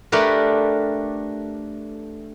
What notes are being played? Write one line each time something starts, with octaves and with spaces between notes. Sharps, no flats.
A3 D4 G4 A#4 B4